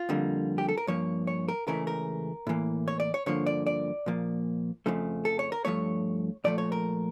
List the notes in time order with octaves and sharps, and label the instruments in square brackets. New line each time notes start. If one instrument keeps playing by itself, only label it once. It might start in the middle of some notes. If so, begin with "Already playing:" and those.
Already playing: [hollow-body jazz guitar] F4
F2 D3 G3 A#3
G4
A4
A#4
G2 F3 A#3 C#5
C#5
A#4
C#2 C#3 E3 A3 A#4
A#4
A2 E3 A#3
C#5
D5
C#5
G2 D3 F3 A#3 C#5
D5
D5
A#2 F3 A#3
F2 C#3 F3 A3
A4
C#5
A#4
G2 F3 A3 C#5
A#2 F3 A3 D5
C#5
A#4